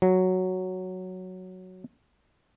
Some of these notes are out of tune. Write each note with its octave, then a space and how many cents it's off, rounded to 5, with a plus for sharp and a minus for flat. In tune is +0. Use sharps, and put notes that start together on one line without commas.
F#3 +0